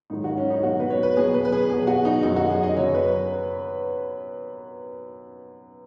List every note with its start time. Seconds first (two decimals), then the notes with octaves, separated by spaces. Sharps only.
0.10 G#2 D#3 F#3 D#4
0.24 F#4
0.37 C#4
0.50 D#4
0.63 B2 F#3 F#4
0.80 B4
0.90 C#5
1.03 B4
1.17 B2 F#3 G#4
1.34 B4
1.45 B4
1.52 G#4
1.70 B2 F#3 G#4
1.87 F#4
2.05 D#4
2.23 F#2 D#3 F#3 D#4
2.36 F#4
2.50 G#4
2.63 D#5
2.77 F#2 C#3 F#3 C#5
2.94 B4